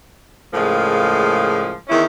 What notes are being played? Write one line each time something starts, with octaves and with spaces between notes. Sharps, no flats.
A2 C#3 F3 G#3 A#3
E2 D#3 C#4 E4